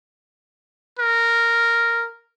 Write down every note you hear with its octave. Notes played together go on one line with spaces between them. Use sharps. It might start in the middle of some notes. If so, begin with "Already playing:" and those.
A#4